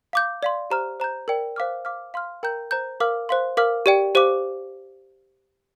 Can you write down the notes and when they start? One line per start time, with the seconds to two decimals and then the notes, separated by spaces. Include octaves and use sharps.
0.13 F5 D6 G6
0.43 D5 F5 C6
0.70 G4 C5 A#5 F6
1.00 C5 A#5 G6
1.28 A#4 D5 G5
1.56 C5 F5 D6 F6
1.85 F5 D6 F6
2.14 F5 C6 F6
2.43 A#4 G5 A#5 G6
2.71 C5 A#5 G6
3.00 A#4 F5 D6 F6
3.29 C5 F5 C6
3.57 A#4 F5 D6 F6
3.86 G4 D5 G5
4.15 G4 C5 F5 D6